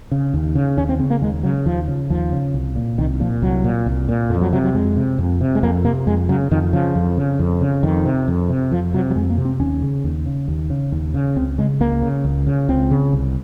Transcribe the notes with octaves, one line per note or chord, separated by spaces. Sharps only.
C#3
D#2
C#3
D#2 C#4
C4
C#3 C4
A#3
D#2 G#3
C#3 F#3
D#2 F3
C#3
D#2 F3
C#3
C2
A#2
C2 D#3
A#2 F3
C2 F#3
A#2
C2
A#2
F2 F3
F#3
C3 F#3
F#3
F2 G#3
C3
F2
C3
G#3
F2 A#3
C3 A#3
F2 G#3
C#3 F#3
F2 D#3
C#3 F3
F2
C#3
F2
C#3
F2 D#3
C3
F2
C3
F2 F3
C3 F#3
F#3
F2 G#3
A#3
C3
C4
D#2 C#4
C#3
D#2
C#3
D#2
C#3
D#2
C#3
C#2 C4
C#3 G#3
C#2 A#3
C#3
C#2
C#3
C#2 C4
C#3
C2